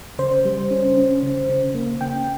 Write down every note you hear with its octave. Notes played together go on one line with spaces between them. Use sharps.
C#3 C5
G3
C#4
C#4
C#3
C#3
A#3
C#3 G5